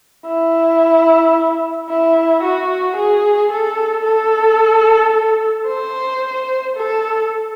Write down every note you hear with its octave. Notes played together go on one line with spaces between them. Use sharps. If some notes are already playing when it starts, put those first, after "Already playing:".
E4
E4
F#4
G#4
A4
A4
C5
A4